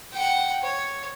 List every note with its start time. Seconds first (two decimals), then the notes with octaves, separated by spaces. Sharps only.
0.12 F#5 G5
0.62 C#5